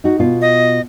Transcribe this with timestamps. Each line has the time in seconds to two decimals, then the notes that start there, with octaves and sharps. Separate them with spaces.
0.04 D#4 F#4
0.19 B2 F4
0.41 D#5